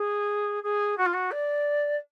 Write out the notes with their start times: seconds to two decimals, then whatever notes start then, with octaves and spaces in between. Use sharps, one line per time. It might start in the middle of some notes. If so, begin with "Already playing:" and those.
Already playing: G#4
0.63 G#4
0.97 F#4
1.05 F4
1.13 F#4
1.31 D5